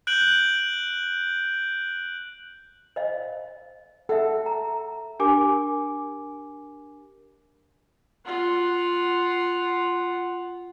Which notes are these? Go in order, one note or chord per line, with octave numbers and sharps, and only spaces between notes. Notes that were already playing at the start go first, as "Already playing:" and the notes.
F#6 G6 D7 F#7
C5 D#5 F5
A4 E5 F#5
A#5
D4 G4 A#4 G#5 D6
F4 F#5